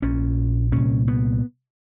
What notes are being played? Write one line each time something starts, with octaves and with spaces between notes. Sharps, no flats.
A#1 A#2 C#4
C2 A#2 C#4
B3